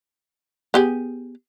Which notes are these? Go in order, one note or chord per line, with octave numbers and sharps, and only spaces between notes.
B3 G4 G#4